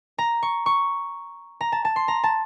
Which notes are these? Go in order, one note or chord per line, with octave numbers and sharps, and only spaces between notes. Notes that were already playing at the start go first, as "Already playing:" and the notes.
A#5
C#6
C#6
A#5
A5
A5
C6
A#5
A5